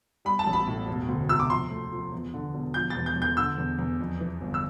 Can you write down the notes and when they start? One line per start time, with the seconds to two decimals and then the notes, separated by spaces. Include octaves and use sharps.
0.25 G3 B5
0.39 A5
0.47 A1
0.53 B5
0.67 A2
0.88 E1
1.08 D2
1.29 C3 E6
1.40 D6
1.50 F3 C6
1.71 A3
1.92 F3
2.12 E2
2.34 D3
2.54 E1
2.74 F3 G6
2.90 A6
2.96 E2
3.06 G6
3.16 E2
3.22 G6
3.37 D3 E6
3.58 E2
3.79 E2
4.00 F2
4.20 E3
4.41 G1
4.54 E6